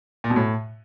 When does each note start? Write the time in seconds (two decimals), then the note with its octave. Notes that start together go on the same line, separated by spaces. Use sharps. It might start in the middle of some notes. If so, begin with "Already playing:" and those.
0.24 A#2
0.30 B2
0.36 A2